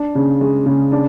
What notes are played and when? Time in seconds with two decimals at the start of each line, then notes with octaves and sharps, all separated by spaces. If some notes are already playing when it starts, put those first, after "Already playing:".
Already playing: D4
0.15 C#3
0.41 G#3
0.66 C#3
0.92 D4